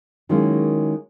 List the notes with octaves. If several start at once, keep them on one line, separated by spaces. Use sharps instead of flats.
D#3 F#3 G#3 A#3 C#4 E4